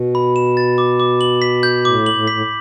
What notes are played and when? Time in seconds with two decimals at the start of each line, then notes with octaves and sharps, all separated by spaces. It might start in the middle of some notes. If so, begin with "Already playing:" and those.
Already playing: B2
0.15 B5
0.36 E7
0.57 A6
0.78 D6
1.00 D6
1.21 F#7
1.42 B6
1.63 G6
1.84 A2 D6
2.06 F#7
2.13 A2
2.28 A2 B6